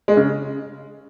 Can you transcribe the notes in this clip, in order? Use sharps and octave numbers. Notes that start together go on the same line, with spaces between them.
G#3
C#3